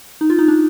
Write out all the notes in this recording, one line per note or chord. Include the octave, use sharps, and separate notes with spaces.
D#4
F4
D#4
D4